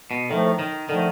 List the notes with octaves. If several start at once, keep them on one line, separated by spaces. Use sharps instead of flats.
B2
A2 D#3 F3 A3
D#3
D3 D#3 F3 A3